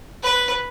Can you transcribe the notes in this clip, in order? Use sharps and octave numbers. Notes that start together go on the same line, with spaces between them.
B4